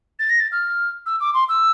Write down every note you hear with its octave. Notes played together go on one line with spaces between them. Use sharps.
A6
A#6
A6
F6
E6
D6
C6
E6